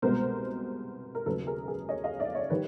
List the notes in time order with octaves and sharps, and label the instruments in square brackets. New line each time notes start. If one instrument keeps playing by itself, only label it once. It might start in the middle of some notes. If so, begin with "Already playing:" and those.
[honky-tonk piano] C2 B2 G#3 B3 A#4 C5
A#4
D#2 C#3 F#3 A3 A4 B4
G#4 A#4
G#4 A#4
C#5 D#5
D#5 F5
D5 E5
C#5 D#5
D#3 G3 B4 C#5